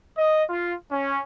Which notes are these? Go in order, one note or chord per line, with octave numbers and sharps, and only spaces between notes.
D#5
F4
C#4